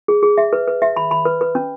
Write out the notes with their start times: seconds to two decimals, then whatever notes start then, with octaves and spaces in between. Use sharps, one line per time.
0.08 G#4
0.23 G#4
0.38 E5
0.53 B4
0.67 B4
0.82 E5
0.96 B5
1.11 B5
1.25 B4
1.41 B4
1.55 C#4